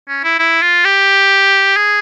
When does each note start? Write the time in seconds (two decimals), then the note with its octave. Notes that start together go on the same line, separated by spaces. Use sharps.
0.08 C#4
0.24 E4
0.39 E4
0.62 F4
0.85 G4
1.76 G#4